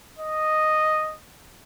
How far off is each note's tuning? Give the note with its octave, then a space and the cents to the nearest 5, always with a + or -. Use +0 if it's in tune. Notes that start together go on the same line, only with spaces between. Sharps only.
D#5 -5